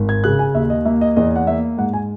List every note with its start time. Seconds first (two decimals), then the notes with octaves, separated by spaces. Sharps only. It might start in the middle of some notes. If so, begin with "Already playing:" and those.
Already playing: G#1
0.09 G#6
0.24 C#3 F#6
0.39 G#5
0.55 D#2 E5
0.70 D#5
0.85 A#3 E5
1.01 D#5
1.16 E2 D#5
1.36 F#5
1.47 A#3 E5
1.77 G#2 F#5
1.93 G#5